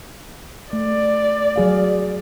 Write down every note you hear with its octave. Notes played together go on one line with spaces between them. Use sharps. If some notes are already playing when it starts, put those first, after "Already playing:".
A3 D5
F#3 G#4 F5